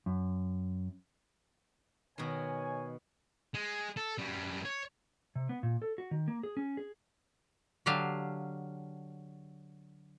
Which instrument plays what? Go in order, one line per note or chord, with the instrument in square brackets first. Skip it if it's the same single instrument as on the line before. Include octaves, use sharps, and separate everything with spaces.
[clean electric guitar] F#2
[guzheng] B2 D#3 [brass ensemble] C#5 G#5
[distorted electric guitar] G#3
A4
F#2 G3
C#5
[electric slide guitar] C3
B3
A#2
A4
F#4
D#3
A#3
G#4
C#4
G#4
[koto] D3 F#3 D4 G4 F5